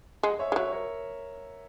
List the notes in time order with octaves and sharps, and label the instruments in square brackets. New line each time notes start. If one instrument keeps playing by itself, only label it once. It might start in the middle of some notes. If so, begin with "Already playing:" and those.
[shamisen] G#3 [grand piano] D#5 F#5
[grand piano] C#5 E5
[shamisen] G#3
[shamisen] F#3 [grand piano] C#5 E5
[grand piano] A#4 C#5